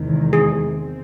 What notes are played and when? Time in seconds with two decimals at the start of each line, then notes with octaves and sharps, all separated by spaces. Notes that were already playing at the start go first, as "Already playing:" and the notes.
Already playing: E2 C3 D#3 G#3
0.33 G#4
0.74 C4